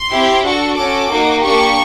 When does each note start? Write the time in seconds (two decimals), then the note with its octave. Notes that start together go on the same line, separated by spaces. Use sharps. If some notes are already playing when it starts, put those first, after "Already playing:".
Already playing: C6
0.12 C4 E4 G4
0.44 D4 F#4 A4 C#6
0.78 C#4 F#4 A4 D6
1.11 A#3 D#4 F#4
1.43 A#3 D4 G4 C#6